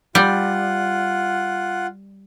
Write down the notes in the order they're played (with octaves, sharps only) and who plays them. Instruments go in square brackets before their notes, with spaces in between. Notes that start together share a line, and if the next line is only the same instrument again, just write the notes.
[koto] G3 [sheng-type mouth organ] F4 F#5